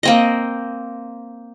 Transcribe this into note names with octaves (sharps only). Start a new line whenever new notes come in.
A#3 C4 D#5